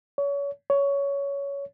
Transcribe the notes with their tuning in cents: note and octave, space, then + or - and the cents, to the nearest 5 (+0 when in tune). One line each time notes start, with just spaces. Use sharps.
C#5 +30
C#5 +15